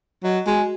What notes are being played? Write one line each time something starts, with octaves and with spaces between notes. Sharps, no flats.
F#3 D#5
G#3 F#4